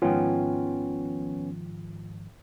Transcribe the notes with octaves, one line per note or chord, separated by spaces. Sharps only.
G#2 D#3 F3 B3 C#4 F4 G5